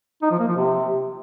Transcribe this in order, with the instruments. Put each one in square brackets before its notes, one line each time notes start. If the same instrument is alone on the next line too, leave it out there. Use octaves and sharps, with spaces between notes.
[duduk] D#4
F3
A#3
F3
C3